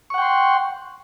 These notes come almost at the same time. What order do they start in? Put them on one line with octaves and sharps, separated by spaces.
C#6 F#5 G5 C6